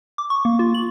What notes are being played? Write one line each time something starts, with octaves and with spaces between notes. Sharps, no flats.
D6
C#6
A#3
F4
F#7